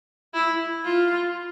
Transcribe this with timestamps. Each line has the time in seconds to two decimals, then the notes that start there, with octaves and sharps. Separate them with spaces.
0.34 E4
0.85 F4